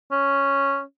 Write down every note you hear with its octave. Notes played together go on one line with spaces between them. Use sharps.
C#4